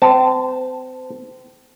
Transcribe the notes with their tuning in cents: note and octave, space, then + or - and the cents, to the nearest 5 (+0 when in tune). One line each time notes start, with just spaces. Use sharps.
C4 -30 A5 +0